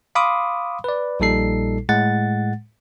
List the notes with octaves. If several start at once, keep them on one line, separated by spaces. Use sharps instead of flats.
F5 B5 C6 D6 D#6
B4 D5
A#1 A#2 G3 D#4 A4 C7
A2 G#3 F#5 A6